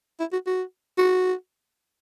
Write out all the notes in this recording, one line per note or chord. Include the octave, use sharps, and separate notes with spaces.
E4
F#4
F#4
F#4